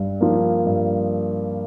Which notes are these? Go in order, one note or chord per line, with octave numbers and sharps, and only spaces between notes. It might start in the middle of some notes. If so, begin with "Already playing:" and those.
Already playing: G2
F3 A#3
G2